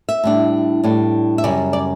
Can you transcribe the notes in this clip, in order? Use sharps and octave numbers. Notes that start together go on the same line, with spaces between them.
E5
A2 G3 D4
A2 G3 D4
E5
F#2 C#3 G3 D5
D5